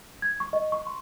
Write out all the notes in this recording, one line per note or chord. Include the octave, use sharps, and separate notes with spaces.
G#6
C#6
D#5
C#6
C6